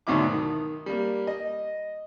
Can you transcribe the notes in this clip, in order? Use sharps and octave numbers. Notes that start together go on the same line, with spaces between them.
D2 G#2 B2 F#3 E4 D6
D#3
G3 A#3
D#5